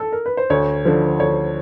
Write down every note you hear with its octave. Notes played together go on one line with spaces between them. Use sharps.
A4
A#4
B4
C5
D2 C#5
D3 F3
D2 C#5